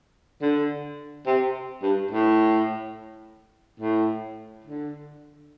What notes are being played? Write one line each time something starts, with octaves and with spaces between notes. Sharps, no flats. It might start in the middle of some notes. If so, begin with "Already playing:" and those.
D3
C3
G2
A2
A2
D3